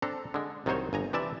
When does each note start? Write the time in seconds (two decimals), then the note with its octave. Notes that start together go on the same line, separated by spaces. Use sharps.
0.02 C4 D4 A4 A#5
0.34 D3 G#3
0.66 C2 D#3 F#3 D#4 C5 C#5
0.93 G1 G#5 A#5
1.13 C3 E3 D5 E5 A5